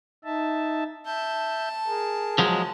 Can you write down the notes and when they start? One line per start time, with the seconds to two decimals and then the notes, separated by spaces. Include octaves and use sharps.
0.24 D#4 E5 A5
1.06 E5 A5 G6
1.87 G#4 A#4
2.38 F3 F#3 G#3